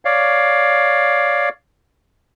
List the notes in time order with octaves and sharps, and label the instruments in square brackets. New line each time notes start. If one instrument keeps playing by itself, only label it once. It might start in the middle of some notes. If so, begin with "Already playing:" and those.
[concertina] C#5 D5 F5